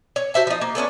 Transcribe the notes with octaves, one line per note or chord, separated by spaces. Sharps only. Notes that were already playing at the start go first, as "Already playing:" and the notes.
C#5
F#4 C5 E5 A5
F3 D#4
A#3
A3 B3 C#4 D4